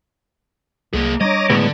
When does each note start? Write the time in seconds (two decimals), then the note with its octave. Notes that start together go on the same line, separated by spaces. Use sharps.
0.93 C2 A#3 G#4
1.21 G3 C4 D4 C#5 D#5 A#5 D6
1.50 A2 D3 G#3 B3